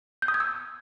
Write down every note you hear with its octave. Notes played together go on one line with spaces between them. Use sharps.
G6
D#6
G#6
E6